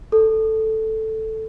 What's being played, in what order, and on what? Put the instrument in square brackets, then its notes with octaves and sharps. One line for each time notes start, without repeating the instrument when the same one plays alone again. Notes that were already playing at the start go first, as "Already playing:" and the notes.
[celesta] A4